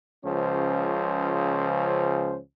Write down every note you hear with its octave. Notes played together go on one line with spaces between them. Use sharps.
C#2 C#3 F3 C#4 C5